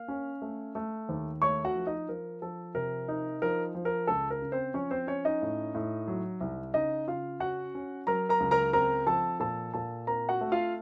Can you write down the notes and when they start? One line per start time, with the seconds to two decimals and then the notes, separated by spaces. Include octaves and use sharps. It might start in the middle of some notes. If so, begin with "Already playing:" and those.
Already playing: A#3 F5 F6
0.08 C#4
0.42 A3
0.75 A3
1.09 D#2
1.42 A3 C#5 C#6
1.65 F#4 F#5
1.75 F3
1.87 D#4 D#5
2.09 F3 A#4
2.42 F3 A4
2.74 C3 A#4
3.08 D#4
3.42 F3 A#4
3.75 F3
3.85 A#4
4.07 C#2 A4
4.30 A#4
4.42 C#3
4.52 C4 C5
4.74 F3 C#4 C#5
4.91 C4 C5
5.07 C#4 C#5
5.25 D#4 D#5
5.42 A2
5.75 A2
6.07 F#3
6.40 C2
6.74 C#3 D#4 D#5
7.07 C#3 F4 F5
7.40 C#4 F#4 F#5
7.75 C#4
8.07 F#3 A#4 A#5
8.29 A#4 A#5
8.40 C#2
8.51 A#4 A#5
8.73 C4 A#4 A#5
9.07 F3 A4 A5
9.40 A#2 A4 A5
9.74 A#2 A4 A5
10.07 C4 A#4 A#5
10.29 F#4 F#5
10.41 A3
10.52 F4 F5